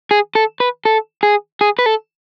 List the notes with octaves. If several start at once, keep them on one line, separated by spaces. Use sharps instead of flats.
G#4
A4
B4
A4
G#4
G#4
B4
A4